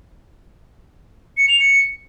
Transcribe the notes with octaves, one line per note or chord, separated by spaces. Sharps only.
C#7
F7
C#7